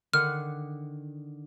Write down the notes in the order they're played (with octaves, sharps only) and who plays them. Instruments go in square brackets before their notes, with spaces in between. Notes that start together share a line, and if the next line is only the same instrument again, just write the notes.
[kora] D3 D#3 F#5 [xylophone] F6